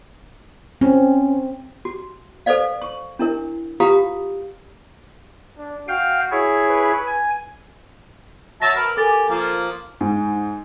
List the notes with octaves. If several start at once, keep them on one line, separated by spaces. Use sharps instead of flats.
C4 C#4
F#4
A4 B4 C5 D5 F5
C#6
D4 E4 A#4
F4 G4 B4 F5 A#5 D#6
D4
F#4 F5 G5
E4 G#4 C#5
B4
G#5
F#3 E5 A5 A#6
A#4 B4
G4 A4 A#4 G#5 A6
F3 A#3
G#2